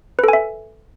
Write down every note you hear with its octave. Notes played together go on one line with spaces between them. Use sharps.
A4 B4 E5 G#5